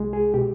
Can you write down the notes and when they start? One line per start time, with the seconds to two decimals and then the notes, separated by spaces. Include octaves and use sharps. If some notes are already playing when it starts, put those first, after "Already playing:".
Already playing: C2 G#3
0.13 G#4
0.34 B2 G4